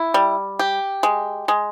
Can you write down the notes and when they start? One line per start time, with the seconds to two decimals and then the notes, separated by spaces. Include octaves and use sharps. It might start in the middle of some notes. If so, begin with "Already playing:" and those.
Already playing: E4
0.14 G3
0.59 G4
1.03 G#3
1.48 G#3